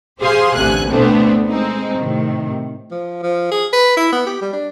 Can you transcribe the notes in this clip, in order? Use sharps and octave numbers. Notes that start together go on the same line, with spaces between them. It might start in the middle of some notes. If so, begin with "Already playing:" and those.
G4 G#4 C5 F5 G#5 C6
A1 D2 C3 A3 G#5 F#6
D2 B2 A3 B3 C4 D4
G#3 C4 D#4
A2 C3 D#3
F3
F3
G#4
B4
E4
B3
G4
G3
D4